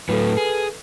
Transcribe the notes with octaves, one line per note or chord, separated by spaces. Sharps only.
A2 F#3 A4 B4
G#4